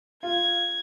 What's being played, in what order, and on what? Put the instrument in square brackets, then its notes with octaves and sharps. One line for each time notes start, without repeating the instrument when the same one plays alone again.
[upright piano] F4 [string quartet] G#6